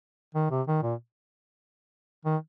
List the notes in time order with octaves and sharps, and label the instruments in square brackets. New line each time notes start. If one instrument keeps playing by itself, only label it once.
[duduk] D#3
C3
D#3
A#2
D#3